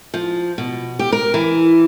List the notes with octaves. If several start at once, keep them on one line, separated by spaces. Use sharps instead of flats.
F3
B2
G4
A#4
E3